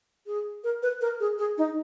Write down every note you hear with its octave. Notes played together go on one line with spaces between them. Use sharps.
G#4
A#4
B4
A#4
G#4
G#4
D#4